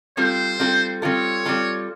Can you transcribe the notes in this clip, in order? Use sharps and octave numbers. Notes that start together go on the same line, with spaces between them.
G3 C4 F4 A4 C5
G3 C4 F4 A4
G3 C4 F4 A4 C#5
G3 C4 F4 A4